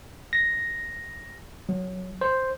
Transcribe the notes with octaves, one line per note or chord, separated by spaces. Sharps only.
A#6
F#3
C5